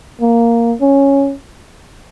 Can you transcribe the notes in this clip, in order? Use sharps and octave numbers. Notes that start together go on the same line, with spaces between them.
A#3
C#4